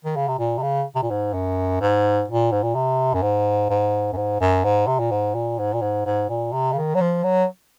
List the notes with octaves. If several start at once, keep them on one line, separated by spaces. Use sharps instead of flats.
D#3
C#3
C3
A#2
C3
C#3
C3
A#2
G#2
F#2
G#2
A#2
G#2
A#2
C3
F#2
G#2
G#2
F#2
G#2
F#2
G#2
C3
A#2
G#2
A#2
G#2
A#2
G#2
G#2
A#2
C3
C#3
D#3
F#3
F3
F#3